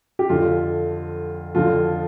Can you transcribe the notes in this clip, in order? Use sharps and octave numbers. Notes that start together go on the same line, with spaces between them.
G4
F2 D3 F3 F4
F2 D3 F3 F4